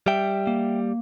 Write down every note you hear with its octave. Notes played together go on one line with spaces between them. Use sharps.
G3 E5 G5
A#3